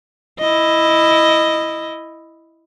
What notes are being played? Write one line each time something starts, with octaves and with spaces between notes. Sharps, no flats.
E4 D#5